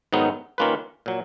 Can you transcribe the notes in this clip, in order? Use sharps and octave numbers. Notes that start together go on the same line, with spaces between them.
G#2 D#3 F#3 B3 D#4
D#3 A#3 C#4 F4 B4
A#2 F#3